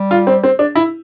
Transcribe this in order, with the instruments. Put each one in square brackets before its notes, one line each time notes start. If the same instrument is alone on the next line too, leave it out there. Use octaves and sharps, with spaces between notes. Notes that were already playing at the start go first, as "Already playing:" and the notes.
Already playing: [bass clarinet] G3
[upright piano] F4
C4
C4
D4
E4